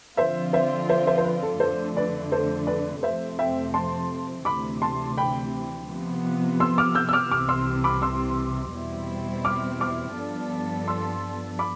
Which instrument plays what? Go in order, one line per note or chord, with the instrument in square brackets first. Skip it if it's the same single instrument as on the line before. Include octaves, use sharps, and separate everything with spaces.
[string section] D3 F3 C4 F4 [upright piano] C5 E5
[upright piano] C5 E5
C5 E5
C5 E5
C5
B4
A4
[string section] F2 D3 A3 [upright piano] A4 C5
[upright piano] B4 D5
A4 C5
B4 D5
[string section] F2 C3 F3 A3 C4 [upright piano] C5 E5
[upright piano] E5 G5
A5 C6
[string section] D2 C3 E3 [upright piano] B5 D6
[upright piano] A5 C6
G5 B5
[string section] C3 F3 B3
[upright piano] C6 E6
D6 F6
E6 G6
E6
D6 F6
[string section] C2 C3 E3 [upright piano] D6 F6
[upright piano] C6 E6
B5 D6
C6 E6
[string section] E2 B2 G3 C4 E4
[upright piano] D6 F6
D6 F6
[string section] G2 F3 B3 D4 A4
[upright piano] C6 E6
B5 D6